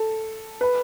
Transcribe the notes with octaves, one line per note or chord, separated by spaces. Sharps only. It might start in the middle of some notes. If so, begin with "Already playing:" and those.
Already playing: A4
B4